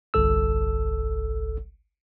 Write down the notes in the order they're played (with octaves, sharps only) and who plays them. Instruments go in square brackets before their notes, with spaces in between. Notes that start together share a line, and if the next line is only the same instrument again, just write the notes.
[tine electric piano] G1 C2 A4 E6